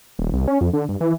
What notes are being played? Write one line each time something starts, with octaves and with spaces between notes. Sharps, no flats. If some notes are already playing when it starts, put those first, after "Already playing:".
D#1
C2
C#4
F2
D3
G2
E3